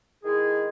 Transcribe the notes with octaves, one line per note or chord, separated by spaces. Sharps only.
D#3 G#3 E4 G#4